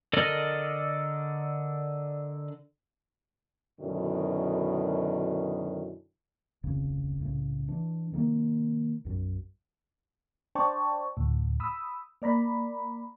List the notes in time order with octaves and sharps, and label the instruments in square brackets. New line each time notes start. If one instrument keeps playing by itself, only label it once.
[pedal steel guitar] D3 A4 A#4 D5 D#5
[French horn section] F#2 B2 D3 D#3 E4
[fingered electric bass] D1 G#1 F2 C#3
C2 A2 C#3
E3 D4
C3 D#3 G3 A#3
B1 F#2
[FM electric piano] D4 C5 D5 G5 A5 C#6
D2 A2
B5 D#6 E6
A#3 D5 A#5 B5